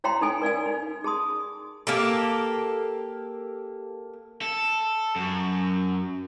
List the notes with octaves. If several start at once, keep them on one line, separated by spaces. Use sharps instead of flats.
E4 C#5 F5 G5 A#5 C6
D#4 A4 G#5
A#4 D5 F5 G#5
D#4
G#4 A5 C6 D#6
A#3 G4 A4
A4
F#2